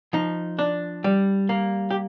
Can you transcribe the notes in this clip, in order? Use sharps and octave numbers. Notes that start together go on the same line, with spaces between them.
F3 D#4
D4
G3
A#3
G4